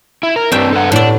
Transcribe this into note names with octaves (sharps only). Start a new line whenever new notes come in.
E4
A#4
G2 C4 D4 E5 G5
A4 B4 F#5
A2 D4 D5